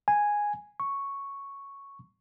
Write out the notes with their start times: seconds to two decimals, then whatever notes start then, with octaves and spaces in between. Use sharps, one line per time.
0.08 G#5
0.80 C#6